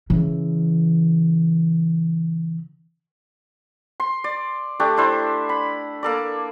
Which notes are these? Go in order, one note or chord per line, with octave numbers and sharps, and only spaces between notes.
C#3 E3
C6
D5
A3 D4 G4
D4 E4 C5
B5
A#3 A4 D5